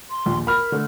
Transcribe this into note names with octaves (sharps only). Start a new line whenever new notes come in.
C6
A#1 D#2
A#4 B5 F6
D3 A3